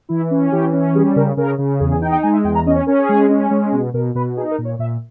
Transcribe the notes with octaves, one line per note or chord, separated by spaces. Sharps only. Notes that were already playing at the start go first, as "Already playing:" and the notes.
E3 E4
C#4
E3 G4
C#4
G3 G#4
C#3 A#4
C#3 A#4
C#3
E2 G#4
G#4
D#4 G5
G5
G#3 G#5
E5
E2 G5
A#5
C#4 D#5
C#5
C#4 A#4
G#4
G#3
C#4
G#3
B2
B2 A#4
B2 B4
D#4 G#4
A#4
A#2
C#5
A#2 E5